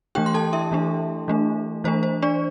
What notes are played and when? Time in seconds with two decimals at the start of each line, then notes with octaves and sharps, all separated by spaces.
0.15 E3 A3 D4 G4 G5
0.26 C6
0.34 A4 A5
0.53 E4 E5
0.72 E3 A3 D4
1.28 E3 A3 D4
1.84 E3 A3 D4 C5
2.03 C5
2.22 D4 D5